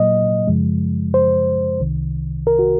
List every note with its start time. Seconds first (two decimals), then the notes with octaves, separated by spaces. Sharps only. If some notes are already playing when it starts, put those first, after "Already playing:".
Already playing: A#2 F#3 A#3 D#5
0.48 F#2 C#3 F3 G#3
1.14 C5
1.80 C2 C3 D#3
2.47 A#4
2.59 F#4